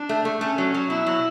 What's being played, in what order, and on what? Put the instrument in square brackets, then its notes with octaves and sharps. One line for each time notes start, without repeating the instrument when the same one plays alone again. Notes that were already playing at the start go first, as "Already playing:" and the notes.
Already playing: [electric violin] D4
[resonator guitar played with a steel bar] A3
A3
[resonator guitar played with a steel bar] A3 [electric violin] C#4
[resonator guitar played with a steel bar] F#3
F#3
[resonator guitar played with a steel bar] B2 [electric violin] E4
[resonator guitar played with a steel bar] F#3